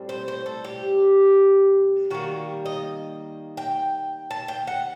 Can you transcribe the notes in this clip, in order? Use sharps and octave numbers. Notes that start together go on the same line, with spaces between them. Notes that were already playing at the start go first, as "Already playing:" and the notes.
Already playing: A2 G3 C4
C5
C5
A4
G4
D#3 G3 A#3 F#4
D#5
G5
A5
G5
F#5